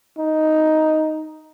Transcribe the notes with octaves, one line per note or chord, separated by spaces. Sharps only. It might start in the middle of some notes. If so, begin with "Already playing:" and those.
D#4